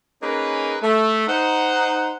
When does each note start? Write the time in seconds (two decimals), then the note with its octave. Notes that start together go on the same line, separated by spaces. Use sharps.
0.22 A#3 C#4 D#4 G#4 A#4 B4
0.82 A3
1.28 D#4 C5 F#5